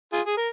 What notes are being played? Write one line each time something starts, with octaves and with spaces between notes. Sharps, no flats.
F4 G#4
G#4
A#4